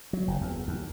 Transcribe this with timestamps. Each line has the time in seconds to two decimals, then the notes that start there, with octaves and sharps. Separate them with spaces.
0.13 F#3
0.28 F#1
0.41 E2
0.68 D#2